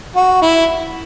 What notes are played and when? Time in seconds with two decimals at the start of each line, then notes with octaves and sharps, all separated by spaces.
0.16 F#4
0.42 E4